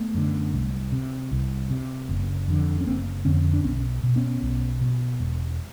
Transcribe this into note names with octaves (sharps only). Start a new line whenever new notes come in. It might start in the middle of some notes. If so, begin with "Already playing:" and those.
Already playing: A3 B3
F#2 D3
C2
C3
C2
C3
F#1
F2 D3
C#4
F#1 A#3 C4
F2 D3 B3 C#4
D4
B1 B3 C#4
B2
B3 C#4
B1
B2
E1